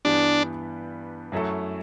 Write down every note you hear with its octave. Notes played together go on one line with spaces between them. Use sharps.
G2 E3 G3 B3 D4
F#2 F#3 A3 E4 A4